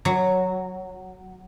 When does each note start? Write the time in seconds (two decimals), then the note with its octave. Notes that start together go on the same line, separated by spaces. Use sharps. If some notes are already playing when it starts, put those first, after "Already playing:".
0.05 F#3